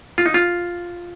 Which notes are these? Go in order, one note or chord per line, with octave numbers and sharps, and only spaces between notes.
F4
D#4
F4